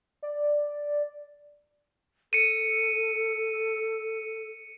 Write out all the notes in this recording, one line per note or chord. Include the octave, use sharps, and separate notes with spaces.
D5
A4 C#7 D#7